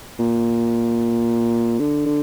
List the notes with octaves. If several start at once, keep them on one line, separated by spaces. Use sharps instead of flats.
A#2
D3
D3